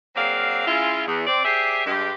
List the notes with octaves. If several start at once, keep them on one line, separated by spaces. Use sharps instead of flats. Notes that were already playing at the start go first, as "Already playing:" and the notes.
F#3 A#3 C4 G#4 D5 F5
G#3 C#4 E4 F4
E2
C4 D5
G4 G#4 C5 D5 E5
G2 G#3 G4